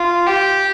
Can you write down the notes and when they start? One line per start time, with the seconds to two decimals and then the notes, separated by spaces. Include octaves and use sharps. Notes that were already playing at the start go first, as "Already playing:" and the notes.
Already playing: F4
0.26 G4